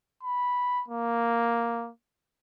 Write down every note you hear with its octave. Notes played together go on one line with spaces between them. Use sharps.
B5
A#3